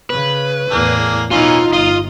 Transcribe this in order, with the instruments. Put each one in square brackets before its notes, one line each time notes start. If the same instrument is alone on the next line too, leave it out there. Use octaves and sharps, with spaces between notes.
[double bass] C#3 [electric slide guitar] B4
[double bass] E2 A2 [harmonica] A#3 D4 G#4
[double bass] B2 D#4 [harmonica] E3 A#3 C#4 [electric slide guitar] F4
[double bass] G1 [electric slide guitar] F4 [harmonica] D#5